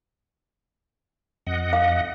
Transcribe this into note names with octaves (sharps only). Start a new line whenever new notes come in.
F2 D#5 F#5
F5